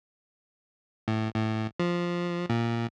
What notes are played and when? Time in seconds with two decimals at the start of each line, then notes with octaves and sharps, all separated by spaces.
1.08 A2
1.36 A2
1.80 F3
2.50 A#2